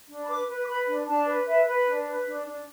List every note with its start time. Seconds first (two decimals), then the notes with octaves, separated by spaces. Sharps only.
0.09 D4
0.24 B5
0.28 B4 D6
0.48 B4
0.64 D6
0.68 B4 B5
0.88 D4
1.07 D4 A5
1.27 B4
1.47 B4 E5
1.67 B4
1.87 D4
2.06 B4
2.25 D4
2.46 D4